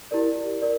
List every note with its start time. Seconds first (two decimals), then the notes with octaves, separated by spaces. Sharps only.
0.11 E4 G4 A#4 D5
0.62 A#4 D5